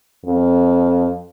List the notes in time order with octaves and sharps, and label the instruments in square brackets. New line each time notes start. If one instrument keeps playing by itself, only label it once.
[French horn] F2